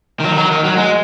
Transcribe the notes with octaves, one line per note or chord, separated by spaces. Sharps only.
D#3
F#3
D#3
F#3
D#3
F#3
G#3